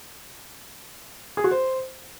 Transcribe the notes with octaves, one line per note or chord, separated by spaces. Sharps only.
G#4
F#4
C5